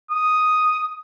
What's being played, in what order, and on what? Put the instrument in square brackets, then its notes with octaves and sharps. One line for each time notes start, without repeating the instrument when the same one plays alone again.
[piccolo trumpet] D#6